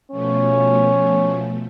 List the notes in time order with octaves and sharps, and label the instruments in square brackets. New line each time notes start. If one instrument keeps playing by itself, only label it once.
[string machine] B2 F3 A3 [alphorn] C#4